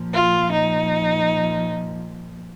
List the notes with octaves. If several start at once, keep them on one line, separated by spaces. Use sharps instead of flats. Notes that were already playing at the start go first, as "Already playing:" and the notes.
Already playing: A#2 F3
F4
D#4